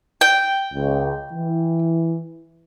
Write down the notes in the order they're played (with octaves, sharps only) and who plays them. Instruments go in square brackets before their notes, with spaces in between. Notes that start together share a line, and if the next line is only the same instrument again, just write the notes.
[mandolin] G5
[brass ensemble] C#2
E3